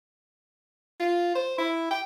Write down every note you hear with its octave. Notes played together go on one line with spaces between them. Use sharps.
F4
C5
E4
G5